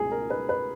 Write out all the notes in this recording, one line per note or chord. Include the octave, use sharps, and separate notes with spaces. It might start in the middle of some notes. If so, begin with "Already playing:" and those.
Already playing: C#2 B2 G#4
A#4
B4
B4